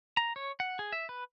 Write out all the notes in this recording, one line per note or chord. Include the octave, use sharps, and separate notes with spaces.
A#5
C#5
F#5
G#4
E5
B4